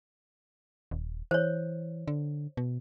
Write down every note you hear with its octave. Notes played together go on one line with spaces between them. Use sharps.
D#1
E3 C5 C#5
D3
B2